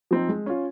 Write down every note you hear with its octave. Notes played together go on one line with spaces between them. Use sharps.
F3 C4 D#4
G#3
C#4 F4